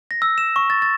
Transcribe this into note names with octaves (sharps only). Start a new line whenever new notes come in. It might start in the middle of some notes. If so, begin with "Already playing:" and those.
A#6
E6
E7
C#6
A6
A6